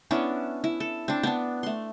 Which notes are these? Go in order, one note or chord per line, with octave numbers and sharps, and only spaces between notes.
B3 C#4 D4 E4
E4
A4
C4 D4
B3 D4
A3 C6